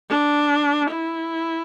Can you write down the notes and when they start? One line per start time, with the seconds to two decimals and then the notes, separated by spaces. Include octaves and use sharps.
0.11 D4
0.90 E4